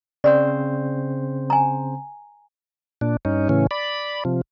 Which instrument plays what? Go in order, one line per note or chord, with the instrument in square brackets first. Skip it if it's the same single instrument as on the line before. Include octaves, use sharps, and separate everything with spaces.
[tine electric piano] C#3 C4 C5 [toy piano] D5
[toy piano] G#5 A#5
[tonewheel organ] A#2 D4
G2 C#4 D#4
A2 C#3 E3 C#4
D5 B5
C3 F3